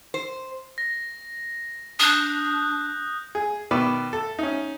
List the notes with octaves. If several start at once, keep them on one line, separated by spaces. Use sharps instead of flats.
C5
A#6
D4 D#6 F#6 G6
G#4
B2 D#3 B4 D5 B5
A4
C#4 D#4